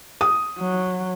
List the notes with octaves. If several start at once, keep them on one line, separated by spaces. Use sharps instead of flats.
D#6
F#3